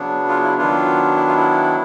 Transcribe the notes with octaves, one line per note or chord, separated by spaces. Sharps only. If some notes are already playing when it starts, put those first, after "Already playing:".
Already playing: C#3 F#3 B3 D4
F4
E4
D#3 F#3 B3 D4 F4
E4
F4
E4